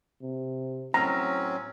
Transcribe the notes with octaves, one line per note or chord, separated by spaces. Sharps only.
C3
A2 F#3 C4 C#4 A#5